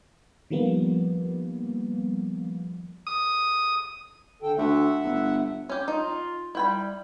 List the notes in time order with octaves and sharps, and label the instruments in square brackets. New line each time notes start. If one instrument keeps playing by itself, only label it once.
[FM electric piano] D#3 F3 G3 A#3 B3
[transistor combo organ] D#6
[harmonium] D3 A4 G5
[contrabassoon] D2 [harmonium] E5 F#5
[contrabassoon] G1
[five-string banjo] C#4 G4
[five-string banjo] D#4 [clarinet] F4
[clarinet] G3 [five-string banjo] E4 G5 B5